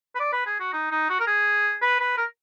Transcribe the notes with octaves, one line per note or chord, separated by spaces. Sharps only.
B4
D5
B4
G#4
F#4
D#4
D#4
F#4
A#4
G#4
B4
B4
A#4